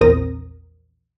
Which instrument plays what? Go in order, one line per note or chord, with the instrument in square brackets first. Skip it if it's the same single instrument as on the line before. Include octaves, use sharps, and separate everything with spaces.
[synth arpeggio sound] A#1 E2 C4 A#4 D#6 A#6